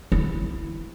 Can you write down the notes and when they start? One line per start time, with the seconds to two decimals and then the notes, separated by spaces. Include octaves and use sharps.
0.12 E4